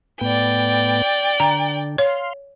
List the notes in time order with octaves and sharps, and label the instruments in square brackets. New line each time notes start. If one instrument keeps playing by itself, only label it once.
[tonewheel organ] A2 B3 [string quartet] D5 G5
[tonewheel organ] D3 [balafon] A#5
[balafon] C#5 [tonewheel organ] F5 C6